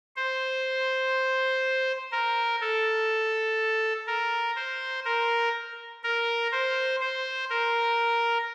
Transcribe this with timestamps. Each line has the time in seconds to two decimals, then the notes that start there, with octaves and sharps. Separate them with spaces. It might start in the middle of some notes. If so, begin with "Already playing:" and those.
0.16 C5
2.12 A#4
2.61 A4
4.07 A#4
4.56 C5
5.05 A#4
6.03 A#4
6.52 C5
7.01 C5
7.50 A#4